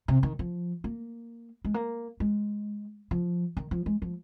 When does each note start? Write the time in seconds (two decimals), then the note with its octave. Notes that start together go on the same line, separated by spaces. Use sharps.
0.08 C3
0.23 D#3
0.39 F3
0.84 A#3
1.65 G#3
1.74 A#3
2.20 G#3
3.11 F3
3.57 D#3
3.71 F3
3.86 G#3
4.02 F3